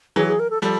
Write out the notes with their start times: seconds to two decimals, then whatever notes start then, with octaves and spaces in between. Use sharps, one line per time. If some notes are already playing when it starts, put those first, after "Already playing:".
0.16 E3 F#3 G#4
0.27 G#4
0.39 A#4
0.50 A4
0.62 F3 G3 A4